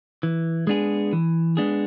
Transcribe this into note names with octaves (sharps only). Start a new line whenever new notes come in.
E3
G#3 B3 D4 G#4
E3
G#3 B3 D4 G#4